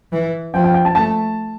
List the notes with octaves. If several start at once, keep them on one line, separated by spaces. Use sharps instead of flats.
E3
F3 G5
G5
G5
A5
A3 A5